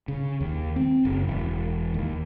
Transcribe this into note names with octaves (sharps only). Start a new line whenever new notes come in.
C#3
D#2
C4
F#1
E1
D#2